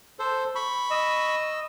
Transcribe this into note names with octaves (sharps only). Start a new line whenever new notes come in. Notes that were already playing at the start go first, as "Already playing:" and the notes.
A4 C5
B5 C#6
D#5 E6